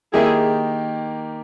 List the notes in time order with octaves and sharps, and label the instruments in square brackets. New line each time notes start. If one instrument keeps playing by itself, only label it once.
[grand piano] D#3 A#3 D#4 G4 [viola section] E4 G#4